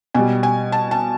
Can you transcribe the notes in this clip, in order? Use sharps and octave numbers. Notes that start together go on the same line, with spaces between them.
B2 G3 G#5
G#5
A5
A5